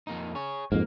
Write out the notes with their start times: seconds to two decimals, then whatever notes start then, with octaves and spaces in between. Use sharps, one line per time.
0.07 F2 A#3 D#4
0.35 G#4 C#5
0.72 F2 G#2 A#3